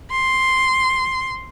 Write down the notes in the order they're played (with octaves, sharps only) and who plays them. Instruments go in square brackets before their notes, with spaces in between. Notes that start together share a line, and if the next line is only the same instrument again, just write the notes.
[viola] C6